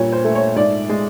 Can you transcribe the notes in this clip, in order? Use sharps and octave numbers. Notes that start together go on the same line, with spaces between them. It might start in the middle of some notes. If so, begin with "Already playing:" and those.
Already playing: G2 A#2 G3 C#5
C5
A3
C#5
G#2 D5
G#3